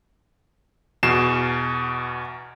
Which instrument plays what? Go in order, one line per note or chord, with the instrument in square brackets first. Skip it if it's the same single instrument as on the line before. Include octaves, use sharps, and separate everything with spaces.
[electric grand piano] E2 B2 C7 E7